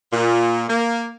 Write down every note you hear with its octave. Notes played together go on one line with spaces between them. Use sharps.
A#2
A#3